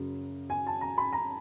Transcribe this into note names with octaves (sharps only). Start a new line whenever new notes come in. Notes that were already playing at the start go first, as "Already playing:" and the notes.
Already playing: F#2 C#3 F#3
G#5
A5
A#5
B5
A#5